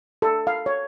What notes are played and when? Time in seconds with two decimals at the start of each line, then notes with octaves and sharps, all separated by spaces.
0.22 A4
0.47 F5
0.66 C#5